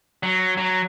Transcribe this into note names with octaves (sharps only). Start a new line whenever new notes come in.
F#3
F#3